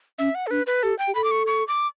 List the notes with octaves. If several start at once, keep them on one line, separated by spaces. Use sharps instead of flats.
C#4 E5
F#5
A4
D4 B4
B4
G4 A4
G5
G4
A4 B5
D6
C#6
C#6
D6